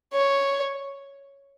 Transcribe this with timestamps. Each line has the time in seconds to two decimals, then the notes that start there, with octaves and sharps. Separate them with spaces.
0.13 C#5